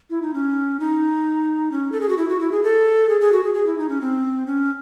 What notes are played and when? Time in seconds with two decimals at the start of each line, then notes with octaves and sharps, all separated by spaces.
0.10 E4
0.22 D#4
0.34 C#4
0.80 D#4
1.72 C#4
1.92 A4
2.01 G#4
2.09 F#4
2.18 E4
2.29 F#4
2.40 E4
2.52 G#4
2.63 A4
3.09 G#4
3.21 G#4
3.32 F#4
3.44 G#4
3.55 G#4
3.67 E4
3.78 D#4
3.89 C#4
4.01 C4
4.46 C#4